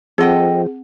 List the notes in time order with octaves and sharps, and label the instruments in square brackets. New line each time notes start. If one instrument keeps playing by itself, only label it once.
[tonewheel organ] F3 [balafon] C4 F#5 [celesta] G#4 [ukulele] A4 D#5 G5